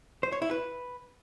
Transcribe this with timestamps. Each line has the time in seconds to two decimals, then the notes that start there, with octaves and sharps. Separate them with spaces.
0.23 C5
0.32 C#5
0.42 E4
0.51 B4